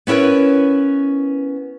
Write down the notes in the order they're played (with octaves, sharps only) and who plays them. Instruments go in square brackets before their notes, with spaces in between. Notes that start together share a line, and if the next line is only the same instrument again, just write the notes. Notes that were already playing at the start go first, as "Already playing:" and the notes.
[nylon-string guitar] B3 C#4 E4 A#4 B4